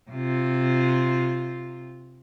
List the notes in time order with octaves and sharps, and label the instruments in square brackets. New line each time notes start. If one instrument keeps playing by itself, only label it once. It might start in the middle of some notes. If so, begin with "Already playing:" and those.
[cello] C3 F4